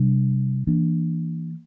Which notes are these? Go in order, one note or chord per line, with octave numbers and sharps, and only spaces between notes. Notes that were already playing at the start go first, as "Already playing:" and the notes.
Already playing: C3 G3 D4
E3 A#3 D4